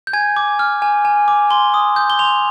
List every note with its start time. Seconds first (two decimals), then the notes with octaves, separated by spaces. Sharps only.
0.07 G6
0.13 G#5 G#6
0.37 D6
0.59 F6
0.82 G#5
1.05 G#5
1.28 D6
1.51 C6 G7
1.74 D#6
1.96 G6
2.10 G7
2.19 C6 F7